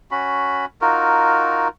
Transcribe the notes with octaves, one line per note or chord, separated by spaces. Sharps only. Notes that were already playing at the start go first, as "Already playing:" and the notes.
C#4 F#4 B5
D#4 F4 F#4 A#4